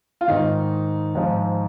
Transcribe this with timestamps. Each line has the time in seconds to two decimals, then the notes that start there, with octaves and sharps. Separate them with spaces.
0.21 F4
0.28 G#2 D#3 D#4
1.15 G#2 F3